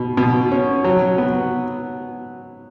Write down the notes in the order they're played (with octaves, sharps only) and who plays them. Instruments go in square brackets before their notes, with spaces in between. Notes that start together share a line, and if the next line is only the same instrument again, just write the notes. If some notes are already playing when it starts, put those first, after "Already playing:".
Already playing: [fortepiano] B2
B2
C#4
F#3
B3